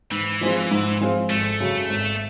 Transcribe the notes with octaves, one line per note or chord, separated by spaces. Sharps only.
G#2 E3
F3 G#3 C4 F4
G#2
F3 G#3 C4 F4
G#1 A3
F#2 C#3
G#1